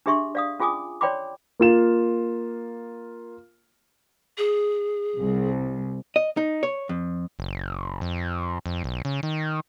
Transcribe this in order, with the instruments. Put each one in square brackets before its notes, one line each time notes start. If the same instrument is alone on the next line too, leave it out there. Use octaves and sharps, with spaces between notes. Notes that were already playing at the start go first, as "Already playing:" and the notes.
[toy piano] D4 G4 G#4 E5 C6 C#6
D5 F5 D#6
C#4 F4 G#4 G#5 D6 D#6
C#5 D5 G5 B5 C6 D6
[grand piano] A#3 F4 E7
[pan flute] G#4
[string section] C2
[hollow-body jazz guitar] D#5
D#4
C#5
F2
[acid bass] F#1
F2
F2
B1
C#3
D#3